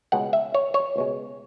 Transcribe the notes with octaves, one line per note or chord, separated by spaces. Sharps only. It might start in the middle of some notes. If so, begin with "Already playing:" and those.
C#2 B2 G#3 F#5
E5
C#5
C#5
C#2 B2 G#3